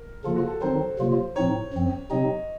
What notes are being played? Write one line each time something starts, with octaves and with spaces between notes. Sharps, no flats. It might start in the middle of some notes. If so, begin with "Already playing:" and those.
Already playing: A#4
C#3 F3 A#3 F4 A4
F#4
A4
D#3 F#3 C4 D#4 C5
C3 F#3 A#3 F4
A2 F3 C4 D#4 C#5
F#2 F3 C4
C3 F#3 C4 D#4 D#5